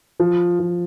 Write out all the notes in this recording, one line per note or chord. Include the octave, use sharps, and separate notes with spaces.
F3
F3